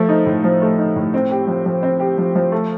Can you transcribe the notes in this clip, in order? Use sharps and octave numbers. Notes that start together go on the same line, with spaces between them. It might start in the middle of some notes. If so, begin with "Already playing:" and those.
Already playing: F3 A3
D#4
A2
F3
A3
D#4
A2
C4
G4
F3
F3
C4
G4
F3
F3
A3